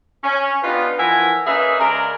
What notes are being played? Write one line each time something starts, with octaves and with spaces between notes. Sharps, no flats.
C#4
B3 D4 D#4 F4 G4 B4
E3 F3 A#4 E5 F#5 G#5
A#3 C#4 D#4 G#4 B4 E5
C#3 G#3 D4 A#4 A#5